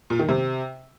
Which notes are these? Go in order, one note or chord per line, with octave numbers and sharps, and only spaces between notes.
A#2
D#3
C3